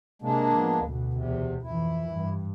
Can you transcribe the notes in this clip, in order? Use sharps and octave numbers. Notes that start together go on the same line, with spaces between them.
C3 G#3 A#3 D4
F3 B3
D2 B2
E2 C3
F2 E3 E4
G2